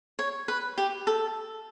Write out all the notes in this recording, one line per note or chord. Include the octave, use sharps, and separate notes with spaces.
C#5
B4
G4
A4